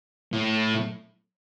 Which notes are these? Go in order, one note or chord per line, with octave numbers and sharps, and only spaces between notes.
A2